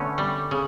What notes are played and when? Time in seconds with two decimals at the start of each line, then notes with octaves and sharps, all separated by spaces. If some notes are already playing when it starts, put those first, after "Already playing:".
Already playing: D3 A3 B3 C#4
0.18 G3
0.51 C#3